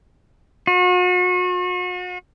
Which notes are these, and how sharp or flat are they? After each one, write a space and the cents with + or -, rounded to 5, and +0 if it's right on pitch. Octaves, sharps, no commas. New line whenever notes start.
F#4 -40